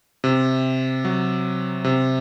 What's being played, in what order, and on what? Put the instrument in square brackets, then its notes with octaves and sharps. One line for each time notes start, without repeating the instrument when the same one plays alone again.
[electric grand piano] C3
F#3
C3